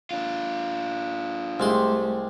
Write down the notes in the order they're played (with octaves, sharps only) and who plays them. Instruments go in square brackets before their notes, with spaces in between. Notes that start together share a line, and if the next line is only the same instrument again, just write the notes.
[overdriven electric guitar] D4 F4
[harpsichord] C2 G#3 C6 [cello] A3 [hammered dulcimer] G4 C5 D#5